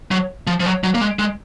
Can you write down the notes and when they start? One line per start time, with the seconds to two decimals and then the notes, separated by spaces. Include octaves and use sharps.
0.11 F#3
0.47 F3
0.60 F3
0.66 F#3
0.84 F#3
0.95 A#3
1.01 G#3
1.19 G#3